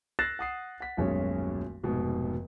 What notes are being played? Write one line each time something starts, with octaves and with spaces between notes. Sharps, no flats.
E6 F#6 A6 A#6 C7 E7
F#5 D#6 C7
F#5 B6
D#1 B1 F#2 G#3 C#4 C#5
F1 G#2 B2